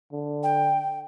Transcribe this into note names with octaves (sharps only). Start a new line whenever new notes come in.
D3
G5